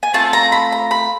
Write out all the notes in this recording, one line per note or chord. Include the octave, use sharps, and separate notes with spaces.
G#5
A3 C4 F4 A5
A#5
B5
A#5
B5